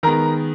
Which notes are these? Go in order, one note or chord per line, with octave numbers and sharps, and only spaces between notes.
D#3 G#3 B3 A#4 A#5